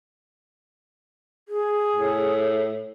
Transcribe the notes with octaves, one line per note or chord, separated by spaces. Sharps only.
G#4
A2